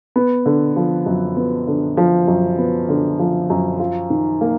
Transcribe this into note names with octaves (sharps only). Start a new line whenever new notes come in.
B3
D3
F3
F#2
B3
D3
F3
F#2
B3
D3
F3
F#2
F4
D#3
A#3